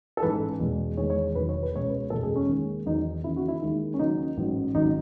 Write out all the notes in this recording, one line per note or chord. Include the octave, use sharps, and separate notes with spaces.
A4
A1 G#2 E3 B4
E2 B2 G#3
E2 D#3 G#3 C#5
C#5
E1 E2 D#3 F#3 B4
C#5
B4
C#2 B2 G#3 C#5
B4
F#1 E2 B2 G#3 A4
G#4
C#4
D#2 D#3 G#3
E2 D#3 F#3 D#4
D#2 C#3 E3 E4
F#4
E4
D#2 D#3 G#3
C#4
D#2 C#3 F#3 D#4
A1 G#2 F#3
G#1 G#2 D#3 F#3 D#4